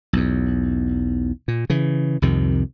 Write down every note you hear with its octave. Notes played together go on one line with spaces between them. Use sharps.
B1 E2
A#2
C#3 E3
C2 F2 C3 D#3